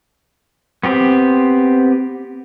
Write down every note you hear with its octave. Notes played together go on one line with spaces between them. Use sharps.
B3 C4 G4